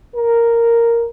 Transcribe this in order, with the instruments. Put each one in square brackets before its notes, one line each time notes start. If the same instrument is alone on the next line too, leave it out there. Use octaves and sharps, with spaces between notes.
[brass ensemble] A#4